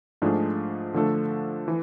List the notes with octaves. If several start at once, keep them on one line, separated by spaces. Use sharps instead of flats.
G#2 F3 A3 D4 G#4
D3 F3 A3 D4 A4
E3